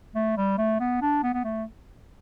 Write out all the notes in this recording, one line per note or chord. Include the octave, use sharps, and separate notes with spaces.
A3
G3
A3
B3
D4
B3
B3
A3